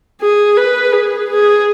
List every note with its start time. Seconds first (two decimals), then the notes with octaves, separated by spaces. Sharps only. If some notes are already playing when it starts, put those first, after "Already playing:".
0.21 G#4
0.56 B4
0.93 G#4
1.30 G#4